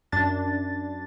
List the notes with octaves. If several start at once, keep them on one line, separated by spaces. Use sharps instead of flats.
F#2 D4 A6